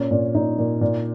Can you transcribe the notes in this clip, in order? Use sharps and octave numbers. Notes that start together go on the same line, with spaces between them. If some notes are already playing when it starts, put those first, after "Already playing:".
Already playing: A#2 C#4
A#2
A#2 D#4
A#2
A#2